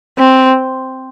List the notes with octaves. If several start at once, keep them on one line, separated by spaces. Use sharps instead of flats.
C4